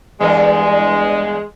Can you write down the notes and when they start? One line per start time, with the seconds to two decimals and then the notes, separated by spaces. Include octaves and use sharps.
0.21 E2 G2 G#3 A#4